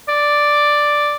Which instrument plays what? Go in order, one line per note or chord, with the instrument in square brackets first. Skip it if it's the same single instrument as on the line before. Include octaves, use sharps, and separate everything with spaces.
[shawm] D5